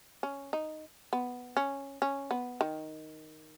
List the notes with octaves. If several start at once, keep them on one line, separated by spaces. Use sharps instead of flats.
C#4
D#4
B3
C#4
C#4
B3
D#3